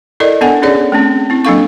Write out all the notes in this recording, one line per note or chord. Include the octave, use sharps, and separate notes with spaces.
E4 A4 A#4 D5 D#5
B3 D4 A4 F#5 G#5
C#4 D#4 G#4 C#5 D5
A3 C4 C#4
C4 E4
F#3 A#3 D4 A4 F5 C#6